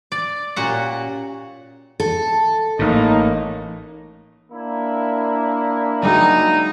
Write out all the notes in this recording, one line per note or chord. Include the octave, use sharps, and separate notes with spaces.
D5
A#2 C#4 F#4 G4 F#5
A4
A1 A2 A#3 D#4
A#3 D4 E4
G3 G#3 D#4 F#4